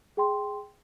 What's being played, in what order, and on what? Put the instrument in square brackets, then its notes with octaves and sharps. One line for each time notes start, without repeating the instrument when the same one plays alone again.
[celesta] G#4 G5 C6